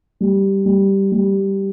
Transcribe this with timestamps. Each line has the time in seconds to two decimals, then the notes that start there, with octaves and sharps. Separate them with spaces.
0.21 G3
0.66 G3
1.12 G3